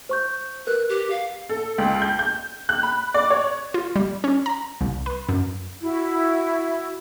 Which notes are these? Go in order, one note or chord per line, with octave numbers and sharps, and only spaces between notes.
C5 C#6 G6
A#4 B4 F#6
G4
F5
A4
C#2
G6
G6
F#6
B5
D5
C#5
F4
G3
C#4
A#5
C2
B4
F#2
E4 F#4